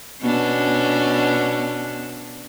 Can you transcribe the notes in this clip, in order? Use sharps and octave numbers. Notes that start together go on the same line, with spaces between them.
B2 C#4 D4